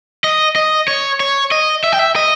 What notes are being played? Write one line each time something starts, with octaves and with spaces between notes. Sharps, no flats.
D#5
D#5
C#5
C#5
D#5
E5
G5
E5
D#5